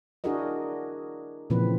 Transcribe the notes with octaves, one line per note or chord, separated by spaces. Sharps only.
D4 E4 F#4 G#4 A#4 D#5
A#2 C#3 E3 F3 C4 B4